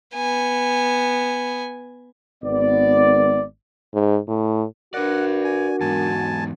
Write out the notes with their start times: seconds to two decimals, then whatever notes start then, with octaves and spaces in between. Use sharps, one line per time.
0.15 B3 G#5
2.43 G#1 B3 D5
3.94 G#2
4.27 A2
4.94 D4 F#4 A#4 B4 D5 F#5
5.45 G#5
5.81 E2 G#2 G#5 A5